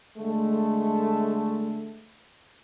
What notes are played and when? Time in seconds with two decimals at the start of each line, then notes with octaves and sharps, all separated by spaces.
0.18 D3 G#3 A3